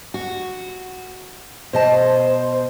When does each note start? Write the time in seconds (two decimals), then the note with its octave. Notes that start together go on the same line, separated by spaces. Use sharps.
0.14 F#4
1.73 B2 C5 D#5 A5